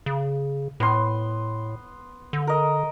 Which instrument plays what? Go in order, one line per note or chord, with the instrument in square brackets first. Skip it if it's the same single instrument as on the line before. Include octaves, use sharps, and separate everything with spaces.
[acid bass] C#3
[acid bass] A2 [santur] B3 C6
[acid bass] D3
[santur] A#4 D#5